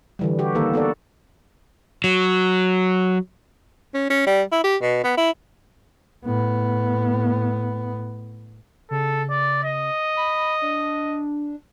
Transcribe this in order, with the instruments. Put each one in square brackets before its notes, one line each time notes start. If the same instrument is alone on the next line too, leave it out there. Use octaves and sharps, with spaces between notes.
[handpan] D3 E3 G3
D3 F#4 G4
D3 D#3 A#3 A4 A#4
B3 F#4 A4 D5
[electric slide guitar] F#3
[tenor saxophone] C#4
C#4
G3
E4
G4
B2
B3
E4
[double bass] A2 B3
[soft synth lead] C#3 [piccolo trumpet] A4
[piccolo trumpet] D5
D#5
[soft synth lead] B5
D4